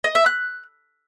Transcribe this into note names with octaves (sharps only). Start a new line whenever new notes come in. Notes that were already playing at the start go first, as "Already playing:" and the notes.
D#5
E5
F#6